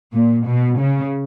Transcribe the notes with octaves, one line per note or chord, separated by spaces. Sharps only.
A#2
B2
C#3